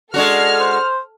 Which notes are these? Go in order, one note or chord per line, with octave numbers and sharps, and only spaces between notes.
G#3 D4 F#4 A4 F6
C5